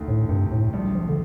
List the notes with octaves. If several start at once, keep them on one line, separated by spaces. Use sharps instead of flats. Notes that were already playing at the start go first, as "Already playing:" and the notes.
Already playing: D2 D#3 A3
A2
G2 C3
A2
A#1 G3
F3
D3